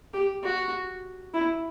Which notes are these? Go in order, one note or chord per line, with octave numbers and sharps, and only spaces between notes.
G4
F#4
E4